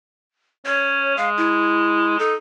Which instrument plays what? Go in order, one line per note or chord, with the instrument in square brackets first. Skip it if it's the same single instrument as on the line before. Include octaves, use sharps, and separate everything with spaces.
[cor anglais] C#4 [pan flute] C#5
[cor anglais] G#3 [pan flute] F5
[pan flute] E4
[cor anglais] D#4 [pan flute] A4